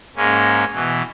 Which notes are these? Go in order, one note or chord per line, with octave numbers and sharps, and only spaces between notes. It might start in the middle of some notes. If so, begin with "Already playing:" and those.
G#2 G#3 A#3 C#4
B2 E3